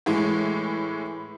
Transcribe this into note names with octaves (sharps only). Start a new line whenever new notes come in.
A2 E3 G#3